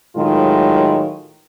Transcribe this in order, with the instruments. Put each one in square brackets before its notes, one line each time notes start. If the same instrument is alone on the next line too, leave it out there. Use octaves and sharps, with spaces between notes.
[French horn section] A2 D#3 F#3 G#3 F4